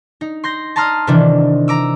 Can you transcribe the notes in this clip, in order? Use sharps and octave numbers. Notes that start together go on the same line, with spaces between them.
D#4
C6 G6 A#6
A5 A#5 C6 D#6 F6
C3 D#3 E3 D4
A#5 D6 E6